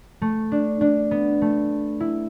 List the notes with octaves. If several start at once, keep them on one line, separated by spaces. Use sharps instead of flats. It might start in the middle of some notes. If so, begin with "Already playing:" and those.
A3
D4
D4
B3
A3
E4